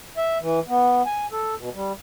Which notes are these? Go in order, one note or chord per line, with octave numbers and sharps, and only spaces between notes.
E5
E3
B3
G#5
A4
B2
G3